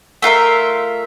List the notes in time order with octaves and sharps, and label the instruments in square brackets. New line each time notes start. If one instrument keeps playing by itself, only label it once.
[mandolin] A3 F4 A#4 E5